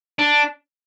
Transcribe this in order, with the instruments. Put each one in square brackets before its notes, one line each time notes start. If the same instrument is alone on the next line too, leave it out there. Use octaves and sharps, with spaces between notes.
[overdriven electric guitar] D4